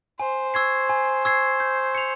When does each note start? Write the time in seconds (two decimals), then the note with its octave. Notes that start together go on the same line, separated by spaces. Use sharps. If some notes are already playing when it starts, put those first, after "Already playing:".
0.20 C5 G#5
0.54 C#6 E6 G#6 C7
0.89 G#5
1.25 C#6 E6 G#6 C7
1.60 G6
1.95 C#7 F7